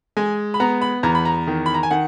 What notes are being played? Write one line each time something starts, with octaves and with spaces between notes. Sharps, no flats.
G#3 G#5
B5
B3 A#5
B5
E2 A#5
B5
A#5
D#3
B5
A#5
G#5
D#3 F#5